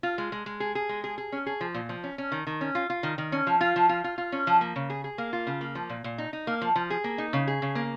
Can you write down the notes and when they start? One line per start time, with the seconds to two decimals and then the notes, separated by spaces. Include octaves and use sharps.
0.03 F4
0.18 G#3
0.32 G#3
0.46 G#3
0.60 G#4
0.75 G#4
0.89 G#3
1.04 G#4
1.18 G#4
1.32 C#4
1.46 G#4
1.61 F3
1.74 A#2
1.89 F3
2.04 C#4
2.18 C#4
2.32 D#3
2.47 D#3
2.61 C#4
2.75 F4
2.90 F4
3.03 D#3
3.18 D#3
3.32 C#4
3.47 F3
3.61 F4
3.76 F3
3.89 F4
4.04 F4
4.18 F4
4.32 C#4
4.47 F3
4.61 A#3
4.76 C#3
4.90 G#4
5.04 G#4
5.18 A#3
5.33 F4
5.47 C#3
5.61 A#3
5.75 F3
5.89 A#2
6.04 A#2
6.18 D#4
6.33 D#4
6.47 A#3
6.61 F3
6.76 F3
6.90 G#4
7.04 A#3
7.18 D#4
7.33 C#3
7.47 G#4
7.62 C#3
7.75 A#3